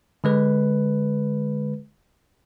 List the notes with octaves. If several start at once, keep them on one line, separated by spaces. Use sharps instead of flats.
D3 G#3 B4